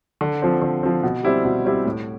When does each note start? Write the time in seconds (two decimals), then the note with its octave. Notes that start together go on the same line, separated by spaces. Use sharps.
0.21 D3
0.42 F3 C4
0.62 D3
0.83 F3 C4
1.03 B2
1.23 G3 C4 E4 G4
1.45 B2
1.65 G3 C4 E4 G4
1.85 A2